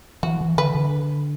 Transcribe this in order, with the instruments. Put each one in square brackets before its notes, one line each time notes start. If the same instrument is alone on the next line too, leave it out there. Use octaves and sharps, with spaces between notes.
[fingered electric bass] E3 [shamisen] F#4
[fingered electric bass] E3
[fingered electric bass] D3 [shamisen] B4
[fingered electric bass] D3